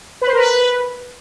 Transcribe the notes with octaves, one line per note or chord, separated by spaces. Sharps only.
B4
C5
A#4
B4